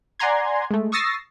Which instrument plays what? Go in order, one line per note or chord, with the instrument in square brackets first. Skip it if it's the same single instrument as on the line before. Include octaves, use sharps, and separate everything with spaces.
[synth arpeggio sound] D5 F#5 G#5 A#5 C6 G#6
G#3 A3
C#6 D#6 E6 A6 A#6 C7